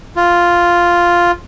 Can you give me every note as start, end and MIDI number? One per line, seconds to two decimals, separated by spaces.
0.16 1.31 65